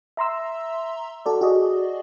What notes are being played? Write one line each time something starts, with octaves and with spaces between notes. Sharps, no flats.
E5 A#5 C6 E6
F#4 A4 D5
F#4 G#4 D5 D#5